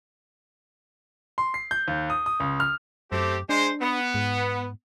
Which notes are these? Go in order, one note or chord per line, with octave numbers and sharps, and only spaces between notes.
C6
C7
G6
D#2
D#6
D#6
C#2
F6
F#2 A3 C4 G4
G#3 D4 C5
B3
G#2